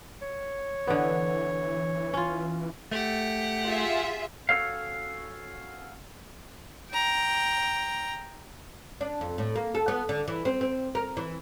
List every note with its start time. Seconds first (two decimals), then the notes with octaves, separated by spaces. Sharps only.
0.22 C#5
0.87 D3 E3 B3
2.14 C#4 F4
2.91 A3 G4 F#5
3.65 F4 G#4 E5
4.49 C#4 F#4 A4 C#5 F5
6.91 G5 A#5
9.01 D4
9.21 F2
9.38 A2
9.56 A#3
9.75 A4
9.88 B3
10.09 D3
10.28 E3
10.45 C4
10.61 C4
10.95 A#4
11.17 E3